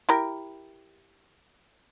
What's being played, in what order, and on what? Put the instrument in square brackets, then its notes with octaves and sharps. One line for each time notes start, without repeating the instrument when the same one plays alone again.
[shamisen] E4 G4 A#4